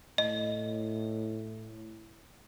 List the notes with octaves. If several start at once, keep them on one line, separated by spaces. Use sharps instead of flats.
A2 D#5